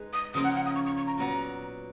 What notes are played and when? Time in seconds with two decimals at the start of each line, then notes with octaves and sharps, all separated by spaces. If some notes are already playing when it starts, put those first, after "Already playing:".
Already playing: G#3 D#4 G#4 B4
0.13 D#6
0.34 C#3 F3 A#3 F4 A#4 D#6
0.44 F#5
0.55 F#5
0.66 D#6
0.76 C#6
0.86 C#6
0.97 C#6
1.07 A#5
1.18 A#2 F#3 B3 F#4 A#5